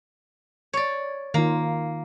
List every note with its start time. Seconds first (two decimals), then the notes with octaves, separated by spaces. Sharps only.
0.73 C#5 D5
1.34 D#3 A#3 F4